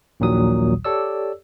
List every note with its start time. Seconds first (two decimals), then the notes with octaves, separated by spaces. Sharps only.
0.20 A#1 D#2 A#2 D#3 F#3 D#6
0.85 G4 A4 C#5 D5 E6